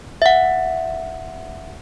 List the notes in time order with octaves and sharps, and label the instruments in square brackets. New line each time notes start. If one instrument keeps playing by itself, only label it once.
[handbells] E5 F#5